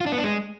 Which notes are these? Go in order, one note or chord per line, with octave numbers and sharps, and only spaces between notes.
F4
D4
B3
D4
G#3